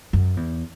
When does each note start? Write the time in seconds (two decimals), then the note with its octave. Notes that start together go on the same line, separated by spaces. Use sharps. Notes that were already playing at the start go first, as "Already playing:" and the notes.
0.13 F#2
0.37 E2